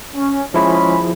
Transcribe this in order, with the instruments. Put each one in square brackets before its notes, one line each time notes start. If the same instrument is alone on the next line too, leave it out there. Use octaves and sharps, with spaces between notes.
[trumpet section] C#4
[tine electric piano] F3 E4 G#4 [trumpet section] G#3 C#4 B5